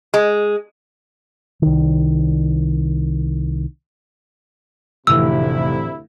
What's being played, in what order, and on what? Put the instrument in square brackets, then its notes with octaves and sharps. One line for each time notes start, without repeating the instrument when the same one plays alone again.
[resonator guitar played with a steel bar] G#3
[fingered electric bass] C2 D#3
[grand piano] F1 [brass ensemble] D2 C3 E4 [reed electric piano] A2 E3 [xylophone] E6